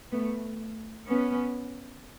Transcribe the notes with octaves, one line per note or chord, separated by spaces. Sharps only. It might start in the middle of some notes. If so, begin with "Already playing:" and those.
A3 B3
B3 C#4